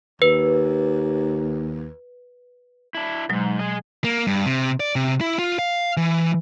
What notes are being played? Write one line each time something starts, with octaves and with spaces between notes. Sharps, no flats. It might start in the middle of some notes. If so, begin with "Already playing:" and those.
D#2 B4
D4 E4
E2 G#2 B2 F#3 G#3
G#4 D#5
A#3
G2
C3
D5
C3
E4
F4
F5
E3